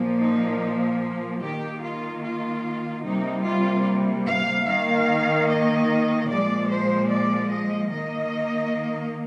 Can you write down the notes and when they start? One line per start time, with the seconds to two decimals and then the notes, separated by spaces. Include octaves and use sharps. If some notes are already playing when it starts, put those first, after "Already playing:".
Already playing: A#2 F3 A#3
0.20 D#4
1.41 D#3 A#3 G4
1.82 F4
2.23 F4
3.04 C3 G3 A#3 D#4
3.44 F4
4.26 F5
4.67 D#3 A#3 F5
5.48 D#5
6.29 A#2 F3 G#3 D5
6.70 C5
7.10 D5
7.51 D#5
7.90 D#3 A#3 D#5